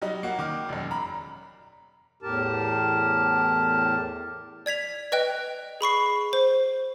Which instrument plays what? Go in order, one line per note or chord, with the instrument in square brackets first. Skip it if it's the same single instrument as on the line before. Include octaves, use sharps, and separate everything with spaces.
[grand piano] F#3 G3 D#4 D#5
A#3 F#4
D#3 D6 F6
E1 F#2
A#5 B5
[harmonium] E2 A2 G4 A#4 A5
[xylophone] D5 G#6 B6 F7
B4 D#5 G5 F#6
G#4 B5 C#6 C7
C5